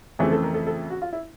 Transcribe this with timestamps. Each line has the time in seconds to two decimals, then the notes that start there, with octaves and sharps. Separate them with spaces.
0.19 F2 C#3 E3 A3 C4 G#4
0.32 A4
0.43 A#4
0.54 A4
0.67 A4
0.90 F#4
1.02 F4
1.13 E4